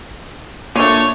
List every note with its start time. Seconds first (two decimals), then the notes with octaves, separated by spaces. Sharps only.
0.76 A#2 D3 A3 C#5